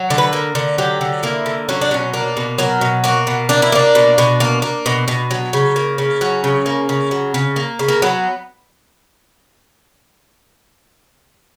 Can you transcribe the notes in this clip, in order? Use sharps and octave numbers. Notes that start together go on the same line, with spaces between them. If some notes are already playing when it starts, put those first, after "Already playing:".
Already playing: F#3
D3
B4
A#3
D3
F#3 G4
D3
A#3 E4
D3
F#3 C#4
D4
B2 C#4
A#3 D4
B2
F#3 A#4
B2
A#3 F#4
B2
A#3 D4
E4
A#3 D4
B2
B2
A#3
A#3
B2
B2
F#3
C#3
A#3
C#3
F#3 C#4
C#3
A#3
C#3
F#3
C#3
A#3
C#3
A#3
F#3 B3